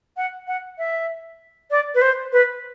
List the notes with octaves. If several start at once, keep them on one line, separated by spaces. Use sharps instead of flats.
F#5
F#5
E5
D5
B4
C5
B4